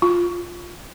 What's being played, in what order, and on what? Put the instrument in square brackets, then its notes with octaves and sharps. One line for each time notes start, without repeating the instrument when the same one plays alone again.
[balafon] F4